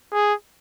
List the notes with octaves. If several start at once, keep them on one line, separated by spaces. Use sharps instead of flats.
G#4